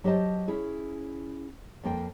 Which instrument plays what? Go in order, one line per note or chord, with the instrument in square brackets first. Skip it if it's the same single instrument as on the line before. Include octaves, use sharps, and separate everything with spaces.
[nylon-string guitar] F#3 G4 C5 D#5 A5
C#4 E4 G#4
F2 A#3 C5 G5